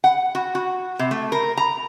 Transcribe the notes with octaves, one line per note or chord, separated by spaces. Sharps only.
F#5
F#4
F#4
C3
A3
A#4
A#5